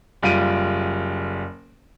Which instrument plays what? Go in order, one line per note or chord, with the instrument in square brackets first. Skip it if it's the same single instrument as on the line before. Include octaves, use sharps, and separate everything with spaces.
[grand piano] F#1 G3 F4 D7 D#7